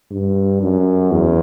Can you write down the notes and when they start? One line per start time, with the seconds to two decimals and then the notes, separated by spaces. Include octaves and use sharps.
0.11 G2
0.61 F#2
1.11 E2